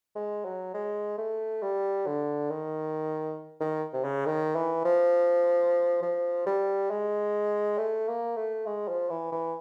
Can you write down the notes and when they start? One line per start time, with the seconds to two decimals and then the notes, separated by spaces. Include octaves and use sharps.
0.15 G#3
0.45 F#3
0.74 G#3
1.18 A3
1.62 G3
2.07 D3
2.50 D#3
3.60 D#3
3.93 C3
4.04 C#3
4.26 D#3
4.56 E3
4.85 F3
6.02 F3
6.46 G3
6.91 G#3
7.78 A3
8.08 A#3
8.37 A3
8.66 G#3
8.89 F3
9.10 E3
9.32 E3